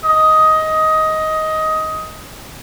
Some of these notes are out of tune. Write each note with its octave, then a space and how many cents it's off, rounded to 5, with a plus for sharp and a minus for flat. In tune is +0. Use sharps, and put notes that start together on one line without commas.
D#5 +15